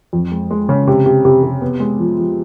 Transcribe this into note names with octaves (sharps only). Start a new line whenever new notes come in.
F2
G#3
G#3
C#3
C3
C3
C3
C3
B3
G#3
F3
F3